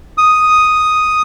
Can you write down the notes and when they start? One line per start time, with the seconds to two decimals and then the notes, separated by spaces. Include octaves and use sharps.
0.18 D#6